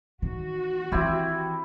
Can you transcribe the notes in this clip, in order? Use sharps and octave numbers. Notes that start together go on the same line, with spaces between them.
D#3 E3 F#4
D#3 E3 C4 E4 G4